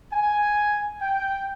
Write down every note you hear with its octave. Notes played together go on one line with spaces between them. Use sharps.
G#5
G5